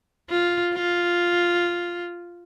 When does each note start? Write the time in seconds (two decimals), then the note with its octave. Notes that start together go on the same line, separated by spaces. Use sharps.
0.30 F4
0.74 F4